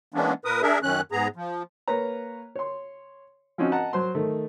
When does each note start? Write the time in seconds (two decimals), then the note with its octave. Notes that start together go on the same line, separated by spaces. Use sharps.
0.14 E3 G#3 A#3 B3 C#4 D4
0.45 A#2 A#4 B4 D#6
0.62 D4 G#4 A#4 E5
0.83 F#2 D#3 C#4 F#6
1.12 G#2 B3 G#4 A#5
1.36 F3
1.88 A#3 B4 C#5 A#5
2.56 C#5 C6
3.58 F3 C4 C#4 D#4 F#4
3.72 D#5 F#5 A5 A#5
3.93 F#3 C5 C6
4.15 D#3 A3